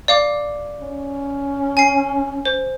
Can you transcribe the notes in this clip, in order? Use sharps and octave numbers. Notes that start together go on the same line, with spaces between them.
D5 F5 D6
C#4
G#5 C7
C5